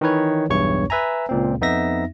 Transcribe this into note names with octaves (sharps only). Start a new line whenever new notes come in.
D#3 E3 D#4 B4 C#5
B1 E2 G2 C#5 C#6
B4 E5 G#5 A#5
C#2 A#2 C4
F2 B3 D#4 E5 A#6